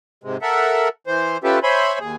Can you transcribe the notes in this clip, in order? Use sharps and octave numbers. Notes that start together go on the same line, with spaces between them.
G#2 C3 G#3
A4 A#4 E5 F#5
E3 C5
C#4 F4 G4 A4 B4 E5
C5 C#5 E5 G#5 B5 C6
D#2 G#4